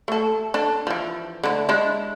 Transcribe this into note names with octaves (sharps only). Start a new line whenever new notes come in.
A3 A4
D4 A4
E3 F3
D3 A3 E4
G#3 D4 E4